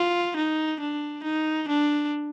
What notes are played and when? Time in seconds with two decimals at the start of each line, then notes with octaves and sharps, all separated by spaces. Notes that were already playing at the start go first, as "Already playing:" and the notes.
Already playing: F4
0.36 D#4
0.80 D4
1.24 D#4
1.68 D4